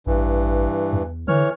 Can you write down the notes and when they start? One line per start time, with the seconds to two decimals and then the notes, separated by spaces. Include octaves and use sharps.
0.07 A1 G2 E3
0.93 E2
1.28 D3 E3 C#5 F6